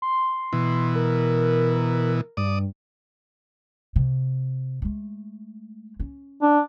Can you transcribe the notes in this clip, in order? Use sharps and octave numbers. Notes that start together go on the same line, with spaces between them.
C6
B2 E3
A#4
G2 D5 D#6
C3
G#3 A3
C#4
D4